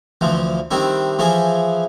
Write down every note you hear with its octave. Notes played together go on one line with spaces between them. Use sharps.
D2 E3 F3
D#3 G3 C4 D4 E4
E3 F3 E4 G#4